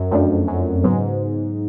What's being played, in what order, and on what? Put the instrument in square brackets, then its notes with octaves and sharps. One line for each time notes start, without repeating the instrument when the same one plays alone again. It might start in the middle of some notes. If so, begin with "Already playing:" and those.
Already playing: [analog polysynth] F#2
[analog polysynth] F2 [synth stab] F#3 A3 D4
[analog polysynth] F#2
[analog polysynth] G#2 [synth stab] C#3 F#3 B3